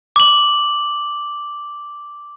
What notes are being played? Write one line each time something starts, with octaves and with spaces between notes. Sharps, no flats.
D6 F#7